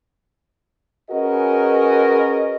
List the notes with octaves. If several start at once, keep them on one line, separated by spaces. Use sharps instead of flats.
C#4 F#4 G#4 A#4 B4 D#5